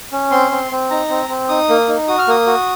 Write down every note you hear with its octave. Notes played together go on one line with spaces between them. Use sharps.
C#4
C4 C6
C4
C4
D#4 A#5
C4
C4
D#4 D#6
A#3
D#4
F#4 D#6
F6
A#3 D#6
F#4